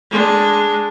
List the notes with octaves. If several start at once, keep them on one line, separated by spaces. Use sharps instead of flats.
G#3 D4